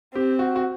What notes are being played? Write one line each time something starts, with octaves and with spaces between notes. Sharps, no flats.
C4 G4
F#4
F#4